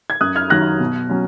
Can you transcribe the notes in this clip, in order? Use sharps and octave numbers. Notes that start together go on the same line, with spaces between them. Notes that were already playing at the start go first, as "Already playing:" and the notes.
G#6
F#2 D#6 F#6
F6 G#6
D#3 F#3 F#6 A#6
B2
F#3 C#4